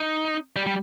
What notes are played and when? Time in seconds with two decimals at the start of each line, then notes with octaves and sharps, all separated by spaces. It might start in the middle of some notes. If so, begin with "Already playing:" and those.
Already playing: D#4
0.56 G3
0.66 G3